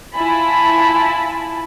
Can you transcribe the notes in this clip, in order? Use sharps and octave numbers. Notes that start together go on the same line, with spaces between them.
E4 F4 G#5 A5 B5